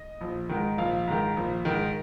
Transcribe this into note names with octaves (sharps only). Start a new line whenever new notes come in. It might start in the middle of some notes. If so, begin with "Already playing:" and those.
Already playing: D#5
A#1
G#2 D#3
A#1 F5
G#2 D#3
A#1
G#2 D#3